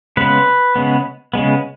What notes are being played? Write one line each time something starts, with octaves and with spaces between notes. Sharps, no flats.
C#3 G#3 B3 B4
C#3 G#3 B3
C#3 G#3 B3